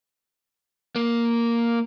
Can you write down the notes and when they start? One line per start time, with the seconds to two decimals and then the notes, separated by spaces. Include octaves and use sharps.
0.96 A#3